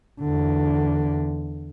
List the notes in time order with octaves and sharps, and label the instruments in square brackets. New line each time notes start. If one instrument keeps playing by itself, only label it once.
[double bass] E2 D3